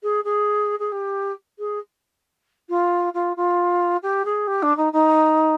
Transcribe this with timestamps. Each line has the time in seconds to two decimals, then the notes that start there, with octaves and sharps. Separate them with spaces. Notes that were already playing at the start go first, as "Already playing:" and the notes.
0.03 G#4
0.24 G#4
0.79 G#4
0.92 G4
1.59 G#4
2.69 F4
3.14 F4
3.37 F4
4.03 G4
4.25 G#4
4.47 G4
4.63 D4
4.77 D#4
4.93 D#4